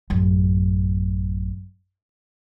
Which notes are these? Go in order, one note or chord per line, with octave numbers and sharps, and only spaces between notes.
A1 F#2